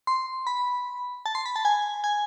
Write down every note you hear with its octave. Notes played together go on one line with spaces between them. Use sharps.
C6
B5
A5
C6
B5
A5
G#5
G#5